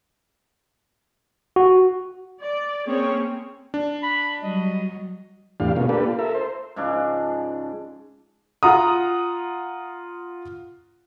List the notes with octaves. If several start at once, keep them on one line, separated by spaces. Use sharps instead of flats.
F#4
D5
A#3 C4 C#4 G#4 C#5
D4
B5
F#3 G3 D#5
E2 A2 D4 G4 F5
B2 G#3 A#3 C#4 F4
A#3 D4 G4 A4 B4
F4
A4 A#4 E5
C5
G#2 C#3 F3 D4
F4 F#5 A#5 D#6